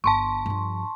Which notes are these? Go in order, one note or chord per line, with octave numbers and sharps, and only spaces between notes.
G1 A5 C6 C#6
G2 F3